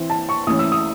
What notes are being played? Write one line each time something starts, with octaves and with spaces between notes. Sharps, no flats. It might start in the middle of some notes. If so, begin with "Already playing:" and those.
Already playing: E3 C4
A5
C#6
E3 A3 C#4 D#6
E6
D#6